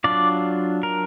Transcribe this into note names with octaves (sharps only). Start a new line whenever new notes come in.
F#3 D4 F4 D5
A#4